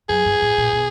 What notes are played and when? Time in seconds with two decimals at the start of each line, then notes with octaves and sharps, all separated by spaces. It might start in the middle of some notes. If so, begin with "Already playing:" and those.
0.09 F#2 G#4
0.25 G2
0.42 A2
0.58 A#2
0.72 B2